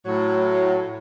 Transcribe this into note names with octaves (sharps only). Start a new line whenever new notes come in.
A2 F#3